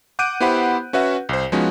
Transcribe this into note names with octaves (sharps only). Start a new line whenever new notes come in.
F#5 D6 F#6 G6 D7 D#7
B3 E4 G4 C5 F#5 B5
C#4 F#4 B4 E5 F#5
C2 C5
F3 G#3 B3 C#4 D#4 F#4